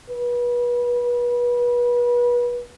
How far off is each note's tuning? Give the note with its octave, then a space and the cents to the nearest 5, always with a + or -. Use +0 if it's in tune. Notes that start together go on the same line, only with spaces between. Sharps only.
B4 -30